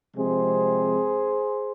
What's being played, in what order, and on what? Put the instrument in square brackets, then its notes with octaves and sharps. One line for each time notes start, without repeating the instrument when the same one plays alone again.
[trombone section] C3 F3 G#3 C4 G#4 C5